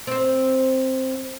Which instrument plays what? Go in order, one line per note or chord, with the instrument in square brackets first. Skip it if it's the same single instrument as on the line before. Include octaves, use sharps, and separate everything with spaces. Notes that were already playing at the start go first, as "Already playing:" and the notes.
[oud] C4 C5